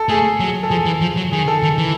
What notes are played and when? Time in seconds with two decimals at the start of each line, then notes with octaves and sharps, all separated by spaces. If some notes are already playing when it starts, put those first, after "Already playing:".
Already playing: A4
0.09 A3 G#4
0.40 F#3
0.63 A4
0.70 F3 G#4
0.86 E3
1.01 F3
1.17 F#3
1.32 D#3 G#4
1.48 A4
1.63 D#3
1.78 E3